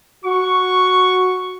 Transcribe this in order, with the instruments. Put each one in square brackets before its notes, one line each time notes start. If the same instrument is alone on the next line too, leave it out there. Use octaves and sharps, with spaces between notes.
[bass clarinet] F#4 [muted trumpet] C#6